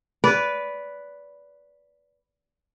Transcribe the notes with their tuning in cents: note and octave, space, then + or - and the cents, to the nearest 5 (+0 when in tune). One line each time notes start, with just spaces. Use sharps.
B4 +0 D5 -25